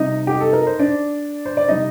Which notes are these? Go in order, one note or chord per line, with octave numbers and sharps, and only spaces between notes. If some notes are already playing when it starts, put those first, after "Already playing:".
Already playing: C3 G3 D#4 D#5
G4
A4
A#4
C5
D4 D5
C5
D5
C3 G3 D#4 D#5